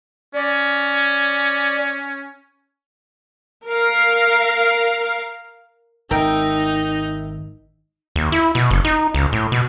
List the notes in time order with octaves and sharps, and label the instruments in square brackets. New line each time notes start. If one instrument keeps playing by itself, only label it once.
[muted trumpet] C#4 [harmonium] D5
[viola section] A#4 F5
[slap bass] G#1 [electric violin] D#4 [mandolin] A#4 E5 G5
[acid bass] D#2
E4
B2
F#1
D#4
C#2
A2
B2